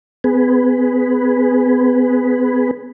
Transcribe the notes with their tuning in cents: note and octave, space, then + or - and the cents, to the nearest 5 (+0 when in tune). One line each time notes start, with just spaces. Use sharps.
B3 +40 G#4 +0 B4 +0